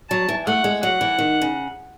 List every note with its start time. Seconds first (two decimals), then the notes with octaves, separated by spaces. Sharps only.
0.10 F#3 A5
0.29 E3
0.46 A3 F#5
0.64 G#3
0.83 F#3 F#5
1.01 E3
1.19 D#3
1.42 C#3